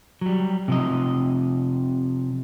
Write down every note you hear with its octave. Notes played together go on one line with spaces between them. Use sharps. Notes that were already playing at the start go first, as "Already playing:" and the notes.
F#3 G3
C3 F3 D#5